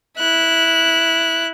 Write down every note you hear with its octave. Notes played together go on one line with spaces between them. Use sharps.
E4 F#6